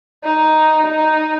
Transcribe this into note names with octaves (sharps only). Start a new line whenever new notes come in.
D#4
D#4